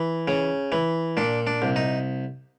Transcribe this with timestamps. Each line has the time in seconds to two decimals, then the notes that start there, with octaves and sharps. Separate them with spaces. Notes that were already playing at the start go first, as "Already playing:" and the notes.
Already playing: E3
0.28 C#3
0.72 E3
1.17 A#2 D4
1.47 D4
1.62 C2
1.76 D#4